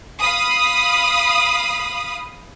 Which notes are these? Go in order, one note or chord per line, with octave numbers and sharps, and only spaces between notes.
F5 B5 D#6